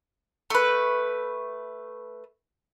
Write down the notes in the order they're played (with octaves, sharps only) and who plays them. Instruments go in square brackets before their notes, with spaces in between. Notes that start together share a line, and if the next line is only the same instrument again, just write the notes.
[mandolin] A3 B4